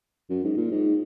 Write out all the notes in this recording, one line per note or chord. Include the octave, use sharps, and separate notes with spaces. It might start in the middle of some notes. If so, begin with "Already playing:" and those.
F#2
G#2
A#2
G#2